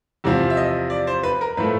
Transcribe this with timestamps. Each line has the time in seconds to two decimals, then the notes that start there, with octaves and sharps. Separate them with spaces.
0.24 E2 C3 F3
0.50 E5
0.57 D#5
0.90 D5
1.07 C5
1.23 B4
1.41 A#4
1.57 A2 F3 A3 B4